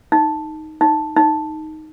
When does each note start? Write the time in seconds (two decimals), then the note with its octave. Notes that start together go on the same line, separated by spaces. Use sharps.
0.12 D#4
0.81 D#4
1.16 D#4